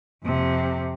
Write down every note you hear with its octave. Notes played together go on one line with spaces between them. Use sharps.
F2 C3